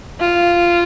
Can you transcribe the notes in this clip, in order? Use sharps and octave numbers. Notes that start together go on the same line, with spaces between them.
F4